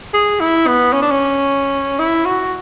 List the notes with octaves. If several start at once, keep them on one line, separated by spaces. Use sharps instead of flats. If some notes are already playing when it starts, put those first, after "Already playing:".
G#4
E4
B3
C#4
D4
C#4
E4
F#4